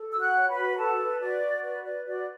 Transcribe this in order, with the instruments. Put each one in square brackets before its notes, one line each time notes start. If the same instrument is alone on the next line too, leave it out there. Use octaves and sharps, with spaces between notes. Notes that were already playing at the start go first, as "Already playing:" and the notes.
Already playing: [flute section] A4
F#4 E6
F#5 F#6
C#5
B4 B5
F#4
A4 B4 A5
B4
F#4 D5
F#4
B4 D5
B4 D5
F#4 D5